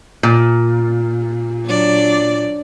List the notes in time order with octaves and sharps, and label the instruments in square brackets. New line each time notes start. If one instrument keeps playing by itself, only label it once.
[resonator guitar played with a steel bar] A#2
[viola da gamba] F#3 D4 D5